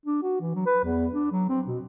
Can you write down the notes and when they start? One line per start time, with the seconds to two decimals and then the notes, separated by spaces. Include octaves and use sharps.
0.05 D4
0.22 F#4
0.41 E3
0.55 F#3
0.66 B4
0.83 E2
1.13 D4
1.31 F#3
1.49 C4
1.67 B2